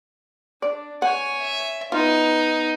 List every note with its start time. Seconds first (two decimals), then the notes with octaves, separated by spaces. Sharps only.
0.62 D4 D5
1.02 C#5 F#5 G#5
1.42 E5
1.92 B3 D#4 F4